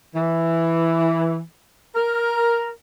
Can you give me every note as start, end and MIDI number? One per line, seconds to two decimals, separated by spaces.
0.14 1.38 52
1.95 2.69 70